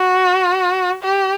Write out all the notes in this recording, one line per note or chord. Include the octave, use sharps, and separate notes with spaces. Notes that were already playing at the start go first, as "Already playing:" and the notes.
Already playing: F#4
G4